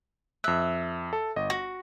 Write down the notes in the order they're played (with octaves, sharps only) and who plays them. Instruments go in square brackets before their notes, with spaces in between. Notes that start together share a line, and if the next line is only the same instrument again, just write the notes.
[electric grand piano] F2 F#6 [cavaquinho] E5
[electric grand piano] A4
G1 D#5
[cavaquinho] F#4 [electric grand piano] A#6